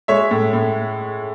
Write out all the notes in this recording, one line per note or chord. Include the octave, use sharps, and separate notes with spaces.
G#3 C#5 E5
A2
A2